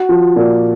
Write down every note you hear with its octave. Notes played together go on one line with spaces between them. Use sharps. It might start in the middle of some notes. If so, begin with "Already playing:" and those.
Already playing: F#4
F3
A#2